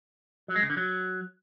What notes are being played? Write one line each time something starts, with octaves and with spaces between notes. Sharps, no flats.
F#3
G#3
C#3
D3
F#3